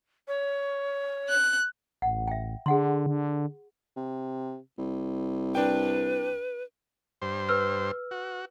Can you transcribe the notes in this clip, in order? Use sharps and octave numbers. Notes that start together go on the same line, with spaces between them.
C#5
F#6
A1 F#5
E5 G5
D3 G#4 F#5 C6
D3
C3
C2
D4 B4 G5
G2 C5
B4 E6 F6
F#4